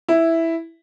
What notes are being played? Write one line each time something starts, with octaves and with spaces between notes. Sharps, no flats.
E4